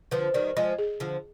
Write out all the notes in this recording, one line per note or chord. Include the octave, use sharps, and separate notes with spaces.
D3 F3 B4
D#3 G3 D5
F3 G#3 D#5
G#4
D3 F3